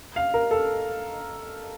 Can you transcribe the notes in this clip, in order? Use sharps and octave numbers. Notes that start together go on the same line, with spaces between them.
F5
A#4
A4